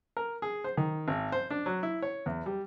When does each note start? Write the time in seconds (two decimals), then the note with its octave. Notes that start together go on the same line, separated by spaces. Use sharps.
0.17 A#4
0.42 G#4
0.64 C5
0.77 D#3
1.08 G#1
1.32 C5
1.51 D4
1.66 F#3
1.83 E4
2.02 C#5
2.26 E2
2.46 G3